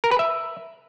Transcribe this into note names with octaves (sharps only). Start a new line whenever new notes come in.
A#4
B4
E5